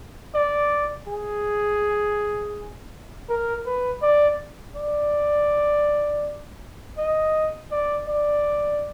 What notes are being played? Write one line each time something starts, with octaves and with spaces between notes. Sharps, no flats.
D5
G#4
A#4
B4
D5
D5
D#5
D5
D5